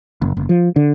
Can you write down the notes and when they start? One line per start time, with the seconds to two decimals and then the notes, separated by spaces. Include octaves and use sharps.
0.22 F#1
0.37 F#1
0.49 F3
0.76 D3